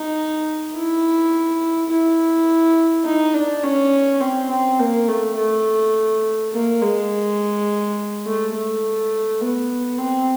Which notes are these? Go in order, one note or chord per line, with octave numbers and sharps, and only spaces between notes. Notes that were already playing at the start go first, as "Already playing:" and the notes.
Already playing: D#4
E4
E4
D#4
D4
C#4
C4
C4
A#3
A3
A3
A#3
G#3
A3
A3
B3
C4